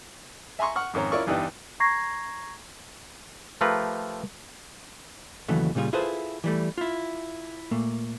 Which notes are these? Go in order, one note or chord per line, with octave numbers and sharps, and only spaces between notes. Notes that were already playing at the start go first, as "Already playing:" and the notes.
E5 G#5 A#5 C6 C#6
F#5 C#6 F6
F2 G#2 D#3 C#4 A#5
C#4 E4 F4 A#4 D5 C#6
E2 G2 E3 D#4 G4 F#6
A#5 C#6 G#6 A#6 C7
F3 A3 F4 G4 A#4 B4
D#2 C#3 E3 F#3 A3
A#2 C#3 G3 F4 G#4
E4 F4 G#4 A4 B4 C5
E3 G3 A3
E4 F4
A#2 A3 A#3